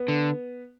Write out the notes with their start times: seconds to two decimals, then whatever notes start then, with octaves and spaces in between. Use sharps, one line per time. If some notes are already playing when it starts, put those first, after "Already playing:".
Already playing: B3
0.08 D3